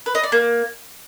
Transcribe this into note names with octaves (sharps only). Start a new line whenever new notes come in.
B4
D#5
D5
A#3